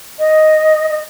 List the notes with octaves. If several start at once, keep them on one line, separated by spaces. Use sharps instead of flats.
D#5
D#5